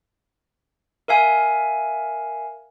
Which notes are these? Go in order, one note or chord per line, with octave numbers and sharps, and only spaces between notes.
A#4 E5 F5 G#5